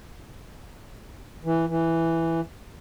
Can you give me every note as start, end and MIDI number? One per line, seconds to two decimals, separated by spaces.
1.44 1.65 52
1.69 2.41 52